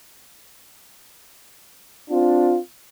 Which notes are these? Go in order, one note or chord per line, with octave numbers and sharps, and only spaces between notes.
C4 D4 F4